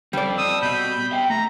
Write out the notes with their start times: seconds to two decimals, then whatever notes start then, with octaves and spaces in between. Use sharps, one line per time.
0.13 G3 C4 A4 D5
0.38 D#6 E6
0.62 B2 B5 G6
1.12 E5 G5
1.30 A3 A#5